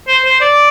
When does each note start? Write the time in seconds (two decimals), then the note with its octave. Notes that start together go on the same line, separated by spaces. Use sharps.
0.07 C5
0.25 C5
0.41 D5